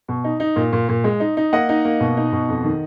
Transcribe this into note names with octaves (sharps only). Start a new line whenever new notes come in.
B2
D#4
D#4
A#2
A#2
A#2
G#3
D#4
D#4
A#3 D#5 F#5
D#4
A#3
B2
D#4
B2
F2
D#3